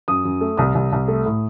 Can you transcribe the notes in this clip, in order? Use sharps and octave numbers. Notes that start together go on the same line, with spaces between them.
F#2 D#6
F#2
A3
C2 D#6
C2
C2
A3
A2